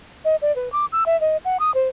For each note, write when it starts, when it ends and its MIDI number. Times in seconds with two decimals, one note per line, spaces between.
0.25 0.36 75
0.42 0.54 74
0.56 0.71 71
0.72 0.86 86
0.92 1.04 88
1.06 1.19 76
1.21 1.37 75
1.45 1.57 78
1.60 1.74 87
1.74 1.88 72